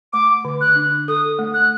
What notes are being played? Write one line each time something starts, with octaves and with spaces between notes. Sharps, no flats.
A3 D6
D3
F#6
D4
A4 D#6
A3
F#6